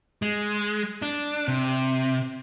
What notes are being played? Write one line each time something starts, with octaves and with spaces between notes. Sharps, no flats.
G#3
D4
C3